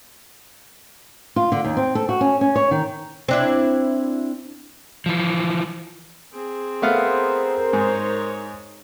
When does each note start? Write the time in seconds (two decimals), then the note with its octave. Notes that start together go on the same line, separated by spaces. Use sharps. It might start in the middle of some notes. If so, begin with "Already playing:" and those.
1.36 F4
1.52 D3
1.64 D#2
1.77 C4
1.95 A4
2.09 F#4
2.21 C#4
2.41 C#4
2.56 C#5
2.71 D#3
3.28 C4 D4 E4
5.06 E3 F3
6.33 C4 G#4
6.82 A3 B3 A#4 C5 F5
7.73 G#2 D#4 C#5